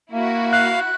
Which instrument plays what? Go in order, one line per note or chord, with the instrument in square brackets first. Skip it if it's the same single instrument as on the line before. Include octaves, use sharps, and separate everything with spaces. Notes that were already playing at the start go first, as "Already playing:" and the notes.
[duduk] A#3 [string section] E4 F#4
[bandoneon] F5 [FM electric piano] F#6